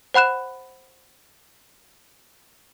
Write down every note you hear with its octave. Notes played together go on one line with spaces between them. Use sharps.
C5 F#5 B5 F#6 E7